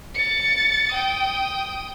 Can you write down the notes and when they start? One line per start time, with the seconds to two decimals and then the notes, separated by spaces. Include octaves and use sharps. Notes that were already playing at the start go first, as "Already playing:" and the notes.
0.15 A6 C#7
0.91 G5 D#6